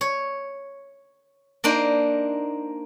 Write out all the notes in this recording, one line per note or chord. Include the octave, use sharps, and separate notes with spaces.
C#5
A#3 D4 D#4 C5